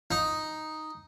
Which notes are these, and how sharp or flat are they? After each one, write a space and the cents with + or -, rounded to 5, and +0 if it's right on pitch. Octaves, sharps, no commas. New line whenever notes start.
D#4 +0